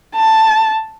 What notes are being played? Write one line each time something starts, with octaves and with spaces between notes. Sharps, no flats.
A5